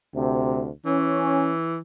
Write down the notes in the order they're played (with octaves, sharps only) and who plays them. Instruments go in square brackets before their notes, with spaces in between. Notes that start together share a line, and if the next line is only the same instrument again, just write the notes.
[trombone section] D2 C3
[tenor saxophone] E3 [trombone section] C#4